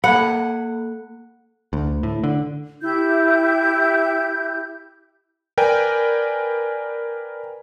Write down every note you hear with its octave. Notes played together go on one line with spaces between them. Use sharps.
A#3 A4 F#5 B5
D2
A2
D3
E4 G4 G6
A#4 B4 D5 G5 G#5